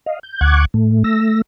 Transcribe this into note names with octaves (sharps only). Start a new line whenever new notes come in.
D#5 F5
G6
D2 F#5 C#6 D6 F#6 G#6
A2 A3
A3 E6 A#6